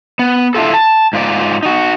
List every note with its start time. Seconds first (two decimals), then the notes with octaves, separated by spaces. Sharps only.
0.19 B3
0.55 D4 E4 F4 A4
0.74 A5
1.13 G#2 F4 D5
1.63 D#4 F#4